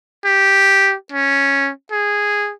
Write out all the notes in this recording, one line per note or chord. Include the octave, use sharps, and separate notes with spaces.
G4
C#4
G#4